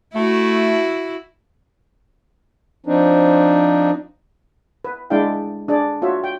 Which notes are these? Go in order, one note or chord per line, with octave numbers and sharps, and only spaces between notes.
A3 E4 F#4
F3 C4 D4 D#4
B4
G#3 D4 E4 D5 F5 G5
D4 G#4 D5
F4 F#4 C#5 E5
G5